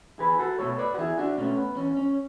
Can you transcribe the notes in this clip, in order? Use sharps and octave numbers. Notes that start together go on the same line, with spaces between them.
E2 G#4 B4
F#4 A4
B2 A3 A4 C#5
B4 D5
F#4
E2 E4 G#4
D4 F#4
B2 A3 C#4
B3
E2 C#4
C#4